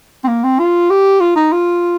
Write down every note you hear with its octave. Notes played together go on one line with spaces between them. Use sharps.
C4
A#3
C4
F4
G4
F4
D#4
F4